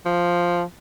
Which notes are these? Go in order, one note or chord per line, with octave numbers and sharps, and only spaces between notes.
F3